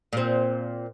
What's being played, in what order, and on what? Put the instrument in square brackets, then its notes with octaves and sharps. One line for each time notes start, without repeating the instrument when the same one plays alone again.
[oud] A#2 C4